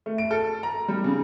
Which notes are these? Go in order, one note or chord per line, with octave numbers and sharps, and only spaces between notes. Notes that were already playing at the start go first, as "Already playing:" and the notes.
A3
D7
A4
A#5
G3
C#3